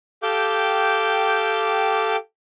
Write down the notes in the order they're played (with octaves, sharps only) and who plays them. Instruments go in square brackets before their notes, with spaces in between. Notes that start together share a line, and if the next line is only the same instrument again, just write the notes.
[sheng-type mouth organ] G4 A4 F5 G5 D6 G6